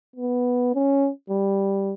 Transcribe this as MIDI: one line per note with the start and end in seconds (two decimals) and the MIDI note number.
0.16 0.74 59
0.75 1.09 61
1.30 1.94 55